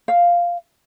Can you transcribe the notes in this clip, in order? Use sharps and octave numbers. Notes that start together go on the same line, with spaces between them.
F5